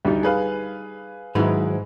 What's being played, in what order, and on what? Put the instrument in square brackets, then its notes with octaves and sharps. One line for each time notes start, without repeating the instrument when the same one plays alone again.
[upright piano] D2 [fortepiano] G3 D#4
[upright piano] G#4 B4 F5
[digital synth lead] G#2 [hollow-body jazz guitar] D#3 F#3 B4 [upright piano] G#3 E4